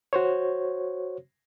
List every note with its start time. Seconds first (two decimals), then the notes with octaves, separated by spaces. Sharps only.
0.13 F#4 C5 C#5